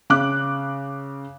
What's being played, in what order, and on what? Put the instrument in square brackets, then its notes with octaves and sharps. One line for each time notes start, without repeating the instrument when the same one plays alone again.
[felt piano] C#3 D6 F#6